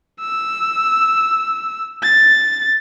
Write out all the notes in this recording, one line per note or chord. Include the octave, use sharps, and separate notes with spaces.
E6
A6